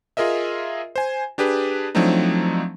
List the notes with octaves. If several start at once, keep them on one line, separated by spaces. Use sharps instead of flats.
F4 G#4 A#4 D#5 E5
C5 G#5
D4 G4 G#4 B4
F3 F#3 A3 C4 D4 D#4